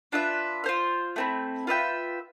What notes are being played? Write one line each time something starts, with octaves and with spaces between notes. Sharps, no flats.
D4 F4 B4 E5
F4 C5 F5
A3 C4 E4
F4 B4 E5 G5